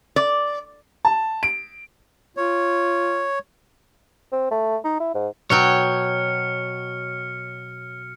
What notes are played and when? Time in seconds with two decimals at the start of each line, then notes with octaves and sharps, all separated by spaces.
0.16 D5
1.05 A5
1.43 D7
2.37 F4 C#5
4.32 C4
4.51 A3
4.84 D#4
5.00 E4
5.14 G#2
5.50 B2 F#3 C#5 G5 F6 C#7